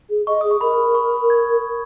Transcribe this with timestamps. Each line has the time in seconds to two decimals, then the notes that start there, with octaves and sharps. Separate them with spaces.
0.10 G#4
0.27 D#5 C#6
0.41 G#4 D#6
0.51 C#6
0.61 A#4 B5
0.95 C#6
1.30 G#6